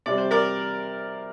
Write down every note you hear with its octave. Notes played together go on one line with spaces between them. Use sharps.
C3 G3 C4 D5
C5
A#4 D5